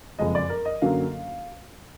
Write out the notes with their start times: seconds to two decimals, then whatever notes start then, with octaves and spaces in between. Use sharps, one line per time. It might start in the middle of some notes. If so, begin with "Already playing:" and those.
0.19 F#1 F2 F3 G#3 D#5
0.35 D5
0.50 A#4
0.65 D#5
0.82 F#2 D3 F#3 A#3 F5